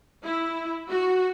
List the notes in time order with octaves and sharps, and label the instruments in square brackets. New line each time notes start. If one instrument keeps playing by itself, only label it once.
[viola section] E4
F#4